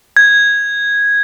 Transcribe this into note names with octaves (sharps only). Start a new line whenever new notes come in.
G#6